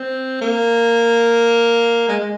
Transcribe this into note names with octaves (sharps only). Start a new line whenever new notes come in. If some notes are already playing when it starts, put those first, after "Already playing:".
Already playing: C4
A#3
G#3
G#3